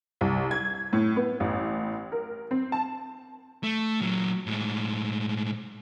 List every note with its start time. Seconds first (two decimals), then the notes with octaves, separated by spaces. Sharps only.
0.21 C2
0.51 G#6
0.93 A2
1.16 B3
1.40 A1
2.12 A#4
2.51 C4
2.72 A5
3.63 A3
4.00 A#2 F#3
4.47 A2 G#3